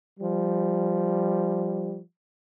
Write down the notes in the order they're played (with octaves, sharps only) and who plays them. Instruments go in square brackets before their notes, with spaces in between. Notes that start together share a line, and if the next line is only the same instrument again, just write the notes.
[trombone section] F3 G3